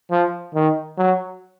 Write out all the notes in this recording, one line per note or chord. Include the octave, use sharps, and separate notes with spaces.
F3
D#3
F#3